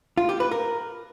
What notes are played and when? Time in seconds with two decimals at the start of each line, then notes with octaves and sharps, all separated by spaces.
0.17 F4
0.29 G4
0.40 B4
0.51 A#4